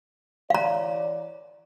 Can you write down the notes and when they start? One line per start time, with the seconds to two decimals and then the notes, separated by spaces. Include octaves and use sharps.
0.50 E3 C#5 D5 F5 A#5